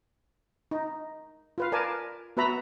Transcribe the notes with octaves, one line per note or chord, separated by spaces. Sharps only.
D#4
F4 B4 F5
A#4 B4 D5 G#5 A5
B3 F#4 B4 E5 A#5 B5